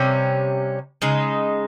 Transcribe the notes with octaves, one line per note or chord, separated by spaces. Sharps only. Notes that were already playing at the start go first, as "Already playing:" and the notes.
Already playing: C3 G3 C#4
C#3 G#3 D#4